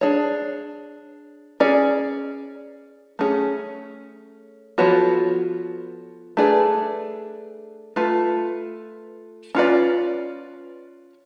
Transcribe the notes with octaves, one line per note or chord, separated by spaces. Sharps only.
D4 G#4 C#5
C#4 G#4 D5
A3 C#4 G#4
F3 B3 F#4 A4 C#5
A3 D4 G#4 B4 D5
A3 F4 B4
C#4 F4 B4 D5